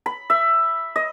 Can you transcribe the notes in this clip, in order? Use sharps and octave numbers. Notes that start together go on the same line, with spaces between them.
B5
E5
D#5